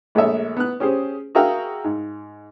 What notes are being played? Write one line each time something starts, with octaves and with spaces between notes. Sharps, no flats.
A#1 G#3 A3 C#5 E5
B3 F#6
C#4 G4 G#4 C5
F#4 G#4 A#4 E5 F5 G5
G#2